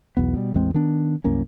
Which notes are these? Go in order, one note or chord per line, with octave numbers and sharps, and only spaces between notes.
B1 E2 B3
B2 G3
A1 E2 G#3 C4
D#3 B3 D4
C2 F#2 A#3 C#4